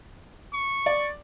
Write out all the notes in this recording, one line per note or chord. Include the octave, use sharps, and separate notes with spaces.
C#6
D5